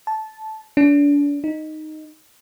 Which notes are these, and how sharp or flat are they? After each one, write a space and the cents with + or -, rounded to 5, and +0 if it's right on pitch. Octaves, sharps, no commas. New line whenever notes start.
A5 -15
D4 -35
D#4 -5